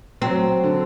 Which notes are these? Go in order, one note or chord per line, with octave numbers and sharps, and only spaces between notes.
F#3 C4
D3